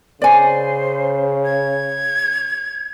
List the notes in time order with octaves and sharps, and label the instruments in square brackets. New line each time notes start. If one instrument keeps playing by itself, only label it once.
[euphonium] C#3 [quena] C5 [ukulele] D5 G#5
[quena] G#6